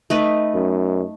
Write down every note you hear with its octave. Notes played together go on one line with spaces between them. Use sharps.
A3 D#4 B4
F#2